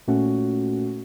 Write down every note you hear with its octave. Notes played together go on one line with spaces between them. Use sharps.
A#2 A3 C#4 F#4